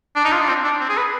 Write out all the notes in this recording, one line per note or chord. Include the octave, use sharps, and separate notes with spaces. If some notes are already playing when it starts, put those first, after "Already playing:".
D4
D#4
F4
D4
C4
D4
C4
G#4
B4